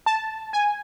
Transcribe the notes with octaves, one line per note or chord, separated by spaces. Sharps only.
A5
G#5